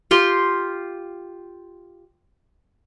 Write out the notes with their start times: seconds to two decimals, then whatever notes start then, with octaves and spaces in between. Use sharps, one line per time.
0.11 F4 G4 C6